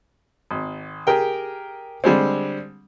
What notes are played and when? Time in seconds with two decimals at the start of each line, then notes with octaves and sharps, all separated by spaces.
0.51 G#1
1.07 G4 G#4 A#4 G5
2.04 D3 G3 G#3 C4